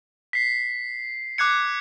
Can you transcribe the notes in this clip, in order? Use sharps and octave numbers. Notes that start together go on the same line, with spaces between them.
B6 C7
D6 F#6 G#6 C#7